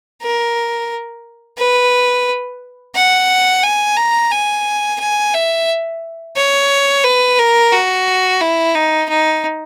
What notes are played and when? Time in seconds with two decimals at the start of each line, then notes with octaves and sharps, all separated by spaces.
0.22 A#4
1.58 B4
2.95 F#5
3.63 G#5
3.97 A#5
4.31 G#5
5.00 G#5
5.34 E5
6.37 C#5
7.04 B4
7.39 A#4
7.72 F#4
8.41 E4
8.75 D#4
9.09 D#4